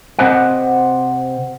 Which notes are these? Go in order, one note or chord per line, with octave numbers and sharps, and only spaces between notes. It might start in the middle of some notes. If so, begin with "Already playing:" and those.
C3 G#3 C4 C5 D#5 F#5